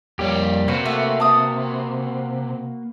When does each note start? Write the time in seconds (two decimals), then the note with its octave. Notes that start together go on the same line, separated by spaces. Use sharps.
0.19 F2 G3 A#3 G4 C#5
0.68 C3 A#3 C4 F#4 B4
0.85 A3
1.20 A5 D#6